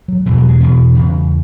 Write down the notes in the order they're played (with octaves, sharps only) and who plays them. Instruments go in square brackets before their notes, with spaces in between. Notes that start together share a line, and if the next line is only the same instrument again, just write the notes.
[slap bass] F#3
E2 B2 E3
F#3
G#3
E2 B2 B3
E2 C#3